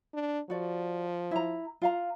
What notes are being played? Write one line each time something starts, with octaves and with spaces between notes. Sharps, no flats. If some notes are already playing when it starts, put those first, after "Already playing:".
D4
F3 F#4 D5
E4 A#5
F4 F5 A#5